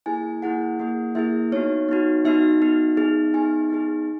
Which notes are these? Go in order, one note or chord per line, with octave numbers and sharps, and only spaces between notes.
A#3 E4 G#4 G#5
A#3 E4 G#4 F#5
A#3 E4 G#4
A#3 E4 G#4 E5
B3 D#4 F#4 C#5
B3 D#4 F#4
B3 D#4 F#4 E5
B3 D#4 F#4
B3 D#4 G#4
B3 D#4 G#4 G#5
B3 D#4 G#4